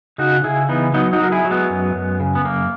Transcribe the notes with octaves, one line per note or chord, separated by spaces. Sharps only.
C#3 D#4 F#4
C#3 E4 G#4
E3 B3 D#4
F#3 B3 D#4
D#4 F#4
F#3 A#4
E4 G#4
F#3
G#3 B3
F#2
F#2
C#3
B3
F#2 A#3